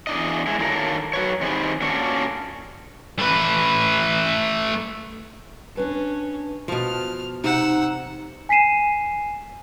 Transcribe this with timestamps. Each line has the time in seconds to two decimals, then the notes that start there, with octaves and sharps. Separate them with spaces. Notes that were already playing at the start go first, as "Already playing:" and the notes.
0.07 E2 D4 D#5
0.47 G#3 E4
0.59 D3 D#3 F#3 A#3 A4 A#4
1.13 F#3 B4 C#5
1.41 D#3 C4 D#4 G4 G#4 B4
1.81 A#2 C#4 D4 F#4 A4
3.19 A3 B4
5.75 C#4 D4 B4 A5
6.68 B2 F3 A5 F6
7.44 C3 D#4 F#5 E6
8.49 G#5 B6 C7 D#7 E7